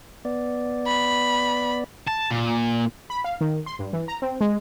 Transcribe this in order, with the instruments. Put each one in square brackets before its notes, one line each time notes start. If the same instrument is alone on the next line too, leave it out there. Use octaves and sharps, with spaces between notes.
[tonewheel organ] B3 D5
[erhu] B5
[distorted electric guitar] A5
A#2
[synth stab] B5
F5
D#3
C6
G2
E3
A#5
C4
G#3